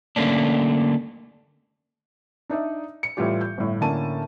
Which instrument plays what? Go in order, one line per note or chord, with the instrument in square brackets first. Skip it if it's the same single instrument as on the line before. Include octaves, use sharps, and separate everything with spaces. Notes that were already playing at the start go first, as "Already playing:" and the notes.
[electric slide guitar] D3 A3 A#3 C#4 D4
[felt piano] D4 D#4 D5 E5
C#7
A2 E3 G3 F4 G4
G6
G1 A2
A2 D3 A#3 C#4 A5 D#7